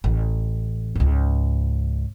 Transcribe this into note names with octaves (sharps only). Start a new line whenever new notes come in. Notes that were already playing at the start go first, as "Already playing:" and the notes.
A1
C#2 G#2